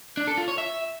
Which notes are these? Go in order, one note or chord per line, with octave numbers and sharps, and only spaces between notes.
D4
A4
F4
C#5
E5